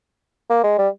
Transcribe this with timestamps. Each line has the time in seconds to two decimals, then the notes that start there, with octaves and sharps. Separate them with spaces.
0.50 A#3
0.63 G#3
0.78 G3